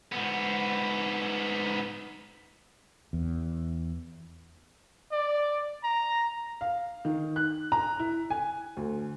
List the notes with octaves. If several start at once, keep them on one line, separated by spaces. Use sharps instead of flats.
G#2 B3
E2
D5
A#5
F5
D#3
F#6
A#5
E4
G#5
D2